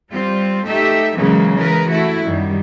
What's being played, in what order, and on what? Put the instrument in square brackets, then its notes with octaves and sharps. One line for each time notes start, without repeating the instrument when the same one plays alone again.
[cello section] G3 C4 F4
A3 D#4 G4 E5
C#3 E3 F#3 G#3 A#3
E3 G#3 A#4 B4
A3 E4 F#4
F#2 D#3 G3